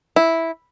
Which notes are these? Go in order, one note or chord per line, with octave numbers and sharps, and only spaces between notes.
E4